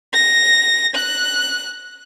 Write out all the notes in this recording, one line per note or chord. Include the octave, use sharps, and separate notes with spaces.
A#6
F#6